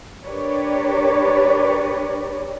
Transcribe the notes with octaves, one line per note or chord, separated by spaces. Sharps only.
D4 G4 A#4 B4 C#5 D5